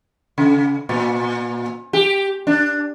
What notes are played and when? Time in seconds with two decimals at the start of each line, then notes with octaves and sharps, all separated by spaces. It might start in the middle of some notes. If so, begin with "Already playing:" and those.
0.38 C#3
0.89 A#2
1.93 G4
2.47 D4